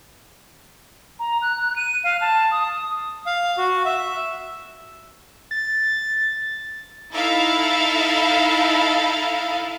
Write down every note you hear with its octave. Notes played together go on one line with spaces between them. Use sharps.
A#5
F#6
D#7
F5
A5
D#6
F5
F#4
E5
A6
D#4 E4 A4 E5 F5